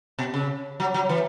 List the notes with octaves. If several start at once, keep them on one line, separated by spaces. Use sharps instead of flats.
B2
C#3
F#3
F#3
E3